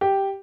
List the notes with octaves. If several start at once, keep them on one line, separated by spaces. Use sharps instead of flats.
G4